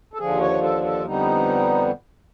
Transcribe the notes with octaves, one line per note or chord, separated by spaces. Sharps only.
A4
D#2 D3 F3 G#4
C#5
A4
A4
F2 D3 G3 B3 D#4